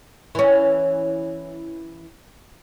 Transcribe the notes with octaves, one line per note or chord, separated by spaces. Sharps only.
E3 C#4